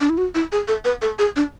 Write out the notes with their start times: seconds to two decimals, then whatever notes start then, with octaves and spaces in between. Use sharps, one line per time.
0.01 D4
0.10 E4
0.18 F#4
0.35 E4
0.52 G#4
0.68 A4
0.85 B4
1.02 A4
1.19 G#4
1.36 D4